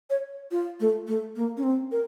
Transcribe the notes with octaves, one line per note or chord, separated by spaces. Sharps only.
C#5
F4
A3
A3
A#3
C#4
C4
A#4